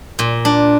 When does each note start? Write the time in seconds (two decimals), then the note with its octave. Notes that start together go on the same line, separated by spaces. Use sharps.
0.19 A#2
0.45 D4